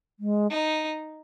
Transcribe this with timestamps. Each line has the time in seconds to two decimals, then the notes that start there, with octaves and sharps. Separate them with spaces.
0.20 G#3
0.51 D#4